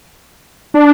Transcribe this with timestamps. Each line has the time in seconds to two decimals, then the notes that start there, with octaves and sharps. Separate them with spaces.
0.74 D4